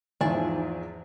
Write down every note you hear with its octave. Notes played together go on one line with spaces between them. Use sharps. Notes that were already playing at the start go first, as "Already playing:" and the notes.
E2 G#2 F3 G#4 E5 A5